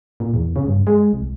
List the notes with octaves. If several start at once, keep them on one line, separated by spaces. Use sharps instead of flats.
A#2
E2
C#3
G2
G#3
C2